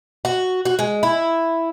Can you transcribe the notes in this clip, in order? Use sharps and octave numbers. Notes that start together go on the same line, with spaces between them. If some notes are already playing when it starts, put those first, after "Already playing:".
F#4
F#4
G#3
E4